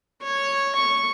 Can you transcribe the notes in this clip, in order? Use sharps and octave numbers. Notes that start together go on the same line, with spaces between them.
C#5
C#6